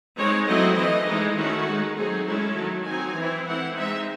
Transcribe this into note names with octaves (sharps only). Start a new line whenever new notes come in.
G#3 C4 D#4 C#5
F#3 A3 C4 E4 D#5
E3 A3 C4 D#5
E3 G#3 D#4
D#3 A3 C#4 E4 F#4
G#3 D#4
F#3 A3 C4 D#4 G#4
G#3 C#4 E4 A4
D#3 F#3 A3
F#3 C4 D#4 G#5
E3 C4 E4
E3 A3 C4 E4 F#5
G#3 C4 D#4 E5